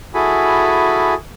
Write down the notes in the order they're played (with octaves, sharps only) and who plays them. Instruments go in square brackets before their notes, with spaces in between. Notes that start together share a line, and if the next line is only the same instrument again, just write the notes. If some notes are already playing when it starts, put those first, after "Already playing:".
[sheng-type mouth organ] E4 F#4 G#4 A4 G#5 B5